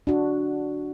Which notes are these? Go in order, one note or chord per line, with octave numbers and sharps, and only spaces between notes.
D4 F#4